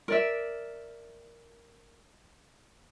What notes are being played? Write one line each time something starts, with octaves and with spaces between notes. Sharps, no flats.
A#4 D5 E5